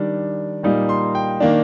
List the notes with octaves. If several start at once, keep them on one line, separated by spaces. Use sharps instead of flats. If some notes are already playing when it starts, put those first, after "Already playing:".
Already playing: D#3 G3 D4
A#2 G3 A#3 D#4
C6
G5
D#3 A#3 D4